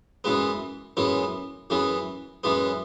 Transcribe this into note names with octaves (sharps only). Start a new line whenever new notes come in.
F#2 E3 G#3 B3
F#2 E3 G#3 B3
F#2 E3 G#3 B3
F#2 E3 G#3 B3